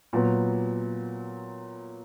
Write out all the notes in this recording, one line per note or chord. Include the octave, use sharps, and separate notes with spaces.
A#2 F#3 B3